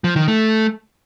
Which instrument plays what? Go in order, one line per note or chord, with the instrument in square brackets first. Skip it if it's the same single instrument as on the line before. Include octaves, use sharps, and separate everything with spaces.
[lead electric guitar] F3
D#3
A3